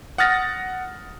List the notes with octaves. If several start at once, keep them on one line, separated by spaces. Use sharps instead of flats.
F#5 D#6 F6 A6 A#6